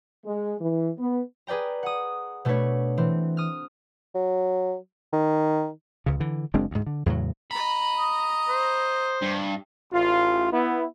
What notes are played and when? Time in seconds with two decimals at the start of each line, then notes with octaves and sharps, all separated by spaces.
0.25 G#3
0.61 E3
0.98 B3
1.47 G#4 B4 D5 G5 A#5
1.83 F#5 D#6
2.45 B2 A3 B3 D4 B4 C#5
2.97 E3 C4
3.37 D#6 F6
4.15 F#3
5.13 D#3
6.06 C#2 C#3
6.20 D3 E3
6.54 F#1 G#3 C4 D4
6.71 D2 G#2
6.87 D3
7.06 E2 A2 C#3 F#3
7.51 D#5 A#5 B5
7.98 D#6
8.49 C5
9.22 G2
9.92 A1 F4
10.52 B3 E4